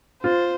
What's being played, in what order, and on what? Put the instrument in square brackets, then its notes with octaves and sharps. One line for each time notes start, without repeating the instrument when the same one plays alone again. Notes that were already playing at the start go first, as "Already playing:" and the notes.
[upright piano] F4 [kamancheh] C5